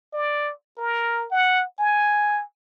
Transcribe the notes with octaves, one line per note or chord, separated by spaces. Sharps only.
D5
A#4
F#5
G#5